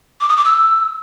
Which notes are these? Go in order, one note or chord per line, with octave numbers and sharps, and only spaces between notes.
D6
D#6
D6
E6